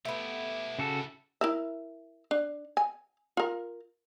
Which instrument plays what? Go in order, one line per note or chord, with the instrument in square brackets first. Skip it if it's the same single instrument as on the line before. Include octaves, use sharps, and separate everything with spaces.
[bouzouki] A3 B3 [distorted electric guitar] E4 G4
[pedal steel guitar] C#3 F#4 A4
[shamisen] E4 A#4 E5
D4
G#5
F4 A#4